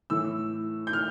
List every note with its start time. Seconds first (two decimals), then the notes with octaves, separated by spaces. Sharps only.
0.10 A2 E3 E6
0.87 G6
0.93 F6